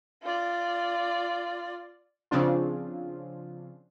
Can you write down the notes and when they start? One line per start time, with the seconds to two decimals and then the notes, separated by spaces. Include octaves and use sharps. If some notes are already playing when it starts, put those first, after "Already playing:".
0.23 F4 D5
2.31 C#3 F3 C4 D4 F4